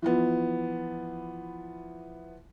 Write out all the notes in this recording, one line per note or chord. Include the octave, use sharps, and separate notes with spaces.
E3 F3 B3